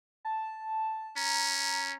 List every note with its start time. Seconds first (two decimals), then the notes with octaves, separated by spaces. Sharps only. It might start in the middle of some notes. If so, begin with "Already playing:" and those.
0.25 A5
1.16 C#4 A#5